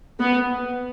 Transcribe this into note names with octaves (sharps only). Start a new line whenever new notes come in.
B3